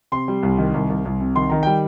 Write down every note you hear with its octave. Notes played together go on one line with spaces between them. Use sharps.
C3 C6
G3
C2
D#3
C2
C2
C2
C3
D#3 C6
D#3 A#5
G3 G5